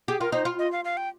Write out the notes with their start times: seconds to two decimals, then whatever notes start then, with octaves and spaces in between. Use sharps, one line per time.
0.08 G4 G#4
0.21 F4 A#4
0.32 D#4 C5
0.45 F4
0.59 D#5
0.72 F5
0.85 F5
0.97 G5